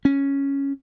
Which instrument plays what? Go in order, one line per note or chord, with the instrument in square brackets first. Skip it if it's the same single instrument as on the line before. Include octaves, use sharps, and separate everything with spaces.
[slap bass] C#4